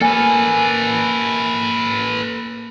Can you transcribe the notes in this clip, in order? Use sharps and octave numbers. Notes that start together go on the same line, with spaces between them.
A#3 A4 B4 G#5